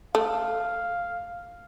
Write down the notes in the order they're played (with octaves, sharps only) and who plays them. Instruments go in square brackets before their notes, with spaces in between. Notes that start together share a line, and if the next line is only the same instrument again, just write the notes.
[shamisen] A3 [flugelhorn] F5